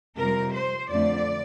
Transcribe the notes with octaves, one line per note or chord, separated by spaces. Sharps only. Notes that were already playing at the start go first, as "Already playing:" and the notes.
F2 C3 G3 C4 A#4
C5
F2 D3 A3 C4 D5